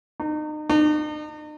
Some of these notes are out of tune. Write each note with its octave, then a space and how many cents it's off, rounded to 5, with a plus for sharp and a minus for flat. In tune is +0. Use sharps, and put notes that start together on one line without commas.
D#4 -35
D#4 -45